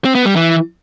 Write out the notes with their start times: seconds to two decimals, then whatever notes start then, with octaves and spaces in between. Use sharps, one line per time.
0.05 C4
0.15 B3
0.25 G3
0.36 E3